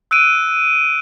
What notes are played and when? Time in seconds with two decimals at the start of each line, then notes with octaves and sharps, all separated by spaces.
0.11 E6 F#6 D7 D#7